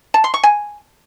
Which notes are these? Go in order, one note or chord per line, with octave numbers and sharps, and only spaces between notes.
A5
C6
C#6
G#5